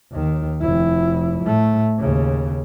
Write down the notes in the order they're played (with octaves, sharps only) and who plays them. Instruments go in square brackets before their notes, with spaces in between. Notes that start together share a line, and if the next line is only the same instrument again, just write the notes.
[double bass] D#2 D#3
F1 E4
A2 A3
D#2 C#3